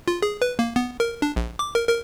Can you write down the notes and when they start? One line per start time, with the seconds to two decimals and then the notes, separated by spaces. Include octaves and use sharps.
0.08 F4
0.22 G#4
0.42 B4
0.59 A#3
0.76 B3
1.00 A#4
1.22 D4
1.36 A#1
1.59 D6
1.75 A#4
1.89 A#4